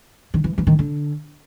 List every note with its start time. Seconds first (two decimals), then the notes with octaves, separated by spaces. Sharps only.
0.34 D#3
0.44 E3
0.58 E3
0.67 D#3
0.79 D3